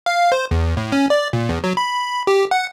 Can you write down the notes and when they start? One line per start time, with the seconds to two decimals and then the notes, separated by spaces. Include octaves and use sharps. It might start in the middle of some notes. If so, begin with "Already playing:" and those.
0.06 F5
0.32 C5
0.51 E2
0.77 A2
0.92 C#4
1.10 D5
1.33 A#2
1.49 E2
1.64 F#3
1.77 B5
2.27 G4
2.51 F#5